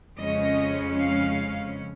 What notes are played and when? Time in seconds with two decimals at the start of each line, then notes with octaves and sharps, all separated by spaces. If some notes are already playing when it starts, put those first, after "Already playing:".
0.19 F2 C#3 G#3 C#4 D#5
1.00 F5